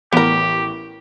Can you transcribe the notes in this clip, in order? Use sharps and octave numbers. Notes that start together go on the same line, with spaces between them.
A1 B3 G4 A#4